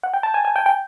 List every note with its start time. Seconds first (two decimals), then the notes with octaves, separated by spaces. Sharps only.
0.03 F#5
0.14 G5
0.23 A5
0.34 G#5
0.45 G#5
0.56 G5
0.66 G5